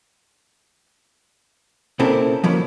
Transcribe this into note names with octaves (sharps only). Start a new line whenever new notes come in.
A#2 C#3 C4 E4 A4 A#4
F3 F#3 A#3 E4